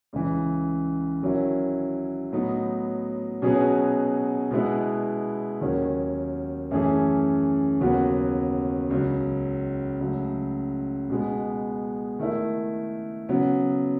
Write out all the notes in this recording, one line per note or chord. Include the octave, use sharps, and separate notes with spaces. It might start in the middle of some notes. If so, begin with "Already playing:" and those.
C#2 C#3 E3
D#3 F#3 C#4 E4
A2 F#3 B3 D#4
B2 F#3 C#4 G#4 B4
B2 G#3 B3 E4 B4
D#2 D#3 F#3 C#4
F#2 E3 A3 C#4 G#4
D#2 C#3 F#3 B3 F#4
C#2 C#3 F#3
C#2 C#3 F#3 A3
B2 G#3 B3
D#3 A3 E4
C#3 F#3 B3